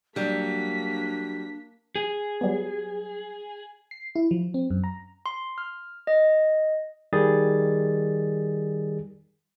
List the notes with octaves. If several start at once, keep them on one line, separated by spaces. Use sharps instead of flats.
F#3 G3 A#3 D4 B6
G#4
F#3 G3 B3
C7
E4
F3
C4
F#2
A#5
C6
F6
D#5
D#3 G3 G#4 A6